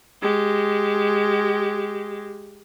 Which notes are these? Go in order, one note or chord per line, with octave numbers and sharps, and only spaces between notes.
G#3 G4